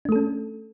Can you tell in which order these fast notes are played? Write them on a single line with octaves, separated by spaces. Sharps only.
D4 A3 A4 C#4